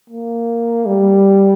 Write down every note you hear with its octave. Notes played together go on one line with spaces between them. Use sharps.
A#3
G3